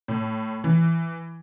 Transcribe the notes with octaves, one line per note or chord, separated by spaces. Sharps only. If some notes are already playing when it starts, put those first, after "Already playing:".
A2
E3